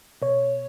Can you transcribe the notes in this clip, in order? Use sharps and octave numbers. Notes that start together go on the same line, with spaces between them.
B2 C#5